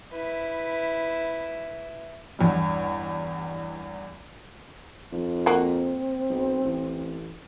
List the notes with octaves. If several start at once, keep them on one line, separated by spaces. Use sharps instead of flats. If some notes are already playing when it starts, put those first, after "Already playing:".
E4 B4
A1 E2 G2
F2 D#4
A#3 C4 F#4
B1
A1